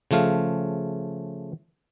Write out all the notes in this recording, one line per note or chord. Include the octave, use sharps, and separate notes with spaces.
C#3 F3 A3 F5